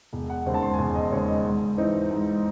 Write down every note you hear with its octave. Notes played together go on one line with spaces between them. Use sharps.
E1
F#5
D#2 C#3 G#3 C4
A5
C6
G#5
E1 A5
D#5
D#2 C#3 G#3 C4 C#5
D#5
G#2
E3 C4 D#4
G#2